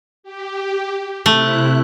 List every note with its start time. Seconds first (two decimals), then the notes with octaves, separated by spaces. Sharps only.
0.23 G4
1.26 C3 A3 E4 F#6